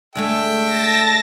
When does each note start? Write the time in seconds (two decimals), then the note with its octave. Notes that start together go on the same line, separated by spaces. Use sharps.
0.15 D2 G#3 A3 A4 E5 G5
0.65 A5 A6 A#6